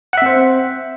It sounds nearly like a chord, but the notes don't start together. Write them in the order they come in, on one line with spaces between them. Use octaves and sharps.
F#5 E5 C4 C5